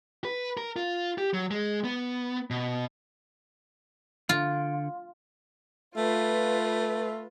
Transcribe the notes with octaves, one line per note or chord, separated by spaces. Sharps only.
B4
A#4
F4
G4
F#3
G#3
B3
B2
D3 F4
A3 F4 B4